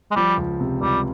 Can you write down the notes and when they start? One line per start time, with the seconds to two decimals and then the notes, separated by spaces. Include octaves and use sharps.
0.11 G#3
0.16 F3 G3
0.37 C#2
0.60 C3
0.81 C#2 G3